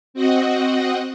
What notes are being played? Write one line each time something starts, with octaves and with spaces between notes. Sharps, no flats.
C4 F#4 D#5 F#5